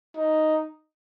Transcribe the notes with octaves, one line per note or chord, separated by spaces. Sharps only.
D#4